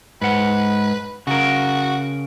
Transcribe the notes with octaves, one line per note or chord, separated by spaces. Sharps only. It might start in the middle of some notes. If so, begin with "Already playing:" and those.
G#2 B4 F#5
C#3 F#4 A#4